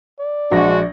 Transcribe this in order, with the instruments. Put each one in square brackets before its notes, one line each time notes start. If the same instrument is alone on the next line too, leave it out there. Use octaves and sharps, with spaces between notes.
[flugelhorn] D5
[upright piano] A#1 C#6 A#6 [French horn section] G#3 D4 F#4